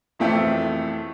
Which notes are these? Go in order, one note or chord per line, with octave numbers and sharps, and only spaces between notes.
E1 F2 E3 A3 E5 G5